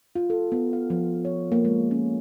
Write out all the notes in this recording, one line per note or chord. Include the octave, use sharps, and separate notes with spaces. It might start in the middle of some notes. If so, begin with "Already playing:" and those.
F4
A4
B3
F5
F3
C#5
A#3
G#3
C#4